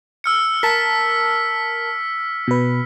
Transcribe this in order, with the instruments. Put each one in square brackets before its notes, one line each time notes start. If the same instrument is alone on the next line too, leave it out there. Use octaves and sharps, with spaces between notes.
[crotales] E6 F6 C#7
[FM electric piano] A#4 A5 [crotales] B6
[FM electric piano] B2 B4